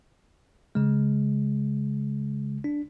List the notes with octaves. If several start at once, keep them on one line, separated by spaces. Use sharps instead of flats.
C#3 G#3
D4